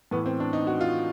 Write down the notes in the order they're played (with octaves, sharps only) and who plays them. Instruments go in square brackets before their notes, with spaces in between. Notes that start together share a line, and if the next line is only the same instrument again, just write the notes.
[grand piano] A2 E3 B3
C4
D4
D#4
F#4
F4